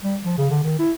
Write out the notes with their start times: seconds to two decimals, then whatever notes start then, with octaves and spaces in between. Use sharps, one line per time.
0.03 G3
0.25 F3
0.38 C#3
0.50 D3
0.64 D#3
0.79 E4